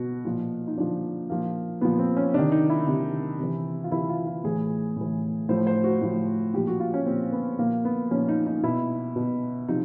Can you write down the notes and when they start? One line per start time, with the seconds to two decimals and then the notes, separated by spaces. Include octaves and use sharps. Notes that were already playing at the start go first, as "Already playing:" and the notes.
Already playing: B2 F#4
0.25 A#2 F3
0.67 D#4
0.77 A#2 F3 D4
1.30 A#2 F3 A#3
1.81 A#2 F3 B3
1.99 C4
2.16 C#4
2.34 C3 D#3 D4
2.52 D#4
2.70 E4
2.87 C3 D#3
3.39 C3 E3
3.84 F4
3.92 C3 E3 E4
4.09 F4
4.27 F4
4.44 A2 E3 G#4
4.96 A2 E3
5.49 A2 F3 C5
5.67 C5
5.84 F#4
6.01 A2 F3
6.54 A#2 F3 G4
6.67 F#4
6.80 F4
6.94 C#4
7.06 A#2 F3 C4
7.32 B3
7.59 A#2 F3 A#3
7.85 B3
8.11 A#2 F3 C#4
8.29 D#4
8.46 D#4
8.63 B2 E4
9.16 B2
9.68 C3 F3 D#4